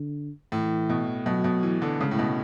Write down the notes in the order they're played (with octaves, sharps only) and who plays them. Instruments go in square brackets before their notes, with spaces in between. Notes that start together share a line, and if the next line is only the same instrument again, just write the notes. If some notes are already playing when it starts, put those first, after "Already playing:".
Already playing: [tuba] D3
[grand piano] A2 [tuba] E3
[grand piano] B2
[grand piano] B2 [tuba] F#3
[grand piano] B2
E3
D3
[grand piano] C#3 [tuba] G#3
[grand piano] A2
B2